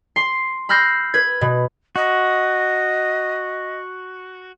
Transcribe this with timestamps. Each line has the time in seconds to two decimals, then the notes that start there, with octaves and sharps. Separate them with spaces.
0.16 C6 C7
0.69 B5 E6 F6 G6 A#6 C7
1.14 B4 G#6
1.41 B2
1.96 F#4 D#5